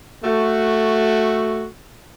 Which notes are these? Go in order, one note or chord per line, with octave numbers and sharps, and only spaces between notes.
A3 F#4